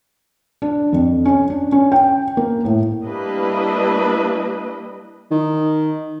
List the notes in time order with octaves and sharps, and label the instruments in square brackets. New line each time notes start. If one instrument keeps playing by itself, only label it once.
[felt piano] D4
F2
C#4
D4
C#4
G5
A#3
A2
[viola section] G3 A#3 D4 E4 B4 D#5
[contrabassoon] D#3